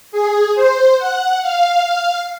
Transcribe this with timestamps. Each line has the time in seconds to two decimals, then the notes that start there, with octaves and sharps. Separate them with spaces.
0.12 G#4
0.55 C5
0.99 F#5
1.41 F5